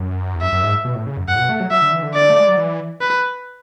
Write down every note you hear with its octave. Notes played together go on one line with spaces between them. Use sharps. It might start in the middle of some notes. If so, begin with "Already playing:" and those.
Already playing: F#2
E2
F#2 E5
F#2
G#2
B2
A2
C#3
F#2
F#2 F#5
A2
B2
A3
F#3
F#3 E5
D3
E3
D3
D5
A3
G#3
F#3
E3
B4